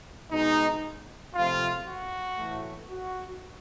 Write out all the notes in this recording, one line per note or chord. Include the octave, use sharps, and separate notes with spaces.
B2 G#3 D#4
C3 F3 A3 F4
F#4
A2 E3 A3
F#4